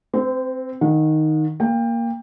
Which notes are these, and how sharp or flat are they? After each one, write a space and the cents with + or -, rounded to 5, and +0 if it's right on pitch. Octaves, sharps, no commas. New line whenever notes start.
C4 +0 C5 -35
D#3 +0 F#5 -40
A#3 +0 G5 +25